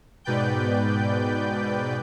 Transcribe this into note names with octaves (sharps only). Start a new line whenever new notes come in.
G#2 B2 B4 D5 G5 G6